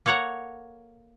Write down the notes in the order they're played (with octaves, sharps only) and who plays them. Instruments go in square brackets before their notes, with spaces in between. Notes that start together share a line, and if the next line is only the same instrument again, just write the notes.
[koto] A#3 A4 C#5 F#5 A#5